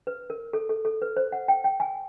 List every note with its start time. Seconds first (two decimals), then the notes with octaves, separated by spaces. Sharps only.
0.07 B4
0.30 A#4
0.53 A4
0.69 A4
0.85 A4
1.02 B4
1.17 C5
1.32 F#5
1.48 G5
1.64 G5
1.80 G#5